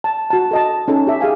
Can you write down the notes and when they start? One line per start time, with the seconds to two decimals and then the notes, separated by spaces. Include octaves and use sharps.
0.04 A5
0.30 F#4 A5
0.51 A4 D#5 A5
0.88 C#4 D#4 A4
1.07 G4 E5
1.21 G4 G#4 F5 G#5